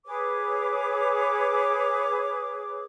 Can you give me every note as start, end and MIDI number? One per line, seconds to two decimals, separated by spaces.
0.06 2.84 68
0.06 2.84 71
0.06 2.84 73
0.06 2.84 86